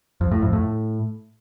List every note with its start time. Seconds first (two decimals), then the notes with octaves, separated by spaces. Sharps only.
0.21 F2
0.31 A2
0.42 F2
0.53 A2